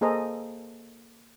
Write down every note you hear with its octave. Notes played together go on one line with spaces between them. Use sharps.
A#3 G#4 A4 C5 D#5 A#5